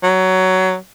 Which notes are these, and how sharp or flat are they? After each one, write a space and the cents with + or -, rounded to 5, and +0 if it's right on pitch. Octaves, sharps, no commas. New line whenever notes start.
F#3 +15